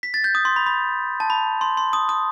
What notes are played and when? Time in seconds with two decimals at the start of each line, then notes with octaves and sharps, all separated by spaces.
0.03 B6
0.14 A6
0.24 G6
0.35 D#6
0.45 C6
0.56 B5
0.66 B5
1.20 A5
1.30 B5
1.61 C6
1.77 C6
1.93 D#6
2.09 D#6